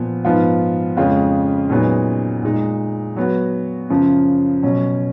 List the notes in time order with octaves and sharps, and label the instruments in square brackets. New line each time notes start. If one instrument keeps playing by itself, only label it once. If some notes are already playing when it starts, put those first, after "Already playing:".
Already playing: [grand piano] A#2 F3 B3
G#2 F3 B3 F4
F2 C#3 G#3 C#4 F4
A#2 F#3 B3 D#4 G#4
A#2 G#3 D#4
F#3 B3 F#4
F#2 C#3 F3
B2 F#3 C#4